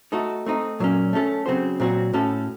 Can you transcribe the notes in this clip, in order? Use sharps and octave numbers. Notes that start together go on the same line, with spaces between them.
A3 D#4 F#4 A4
A3 C4 D#4
A#2 F#3 A#3 C#4
A3 C#4 A4
C#3 F#3 C4 F#4 C5
A#2 F#3 C4 F#4
A2 A3 C#4 F#4 A4